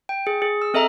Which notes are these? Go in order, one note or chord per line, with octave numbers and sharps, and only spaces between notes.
G5
G#4
G#4
E6
C4 A4 D#5 E5 A#5